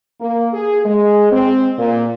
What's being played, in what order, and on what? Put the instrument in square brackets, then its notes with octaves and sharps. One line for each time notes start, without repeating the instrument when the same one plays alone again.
[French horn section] A#3
G#4
G#3
C4
A#2